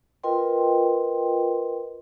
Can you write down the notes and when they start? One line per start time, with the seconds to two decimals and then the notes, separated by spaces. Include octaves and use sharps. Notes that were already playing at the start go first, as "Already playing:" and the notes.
0.23 F4 A#4 B4 D#5 G5 C6